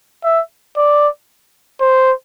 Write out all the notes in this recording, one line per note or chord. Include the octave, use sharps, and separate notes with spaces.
E5
D5
C5